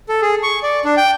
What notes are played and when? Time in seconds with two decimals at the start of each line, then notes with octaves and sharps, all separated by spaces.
0.09 A4
0.22 G#4
0.43 C#6
0.63 D5
0.85 D4
0.97 G5